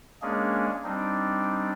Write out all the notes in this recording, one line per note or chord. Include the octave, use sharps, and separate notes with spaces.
G#3 A#3 C#4 D4 G#4
G3 C4 D4 D#4